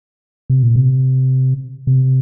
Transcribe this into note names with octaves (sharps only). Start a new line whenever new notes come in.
C3
A#2
C3
C3